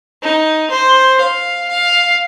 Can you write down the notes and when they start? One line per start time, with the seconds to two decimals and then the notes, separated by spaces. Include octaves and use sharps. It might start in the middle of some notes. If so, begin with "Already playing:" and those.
0.23 D#4
0.71 C5
1.21 F5
1.69 F5